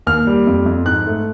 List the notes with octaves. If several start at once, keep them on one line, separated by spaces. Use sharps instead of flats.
D#2 F6
G3
F2
F2
G#2 F#6
A3